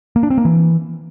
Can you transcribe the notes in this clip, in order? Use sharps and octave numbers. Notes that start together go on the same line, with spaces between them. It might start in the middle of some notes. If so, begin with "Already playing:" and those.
A#3
D4
C4
A#3
E3